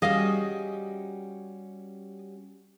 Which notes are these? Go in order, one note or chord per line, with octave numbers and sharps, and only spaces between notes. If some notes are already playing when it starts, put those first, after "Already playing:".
G3 C#4 F#4 G#4 D#5 F5